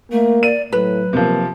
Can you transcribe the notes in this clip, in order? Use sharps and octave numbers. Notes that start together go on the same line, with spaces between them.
A3 A#3
D5 D#7
A2 F#3 B4
C3 F3 A#3